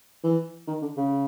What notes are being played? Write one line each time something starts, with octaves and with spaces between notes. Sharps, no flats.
E3
D#3
D3
C#3